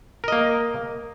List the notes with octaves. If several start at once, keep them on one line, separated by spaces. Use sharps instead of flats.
A#3 A#4 D#5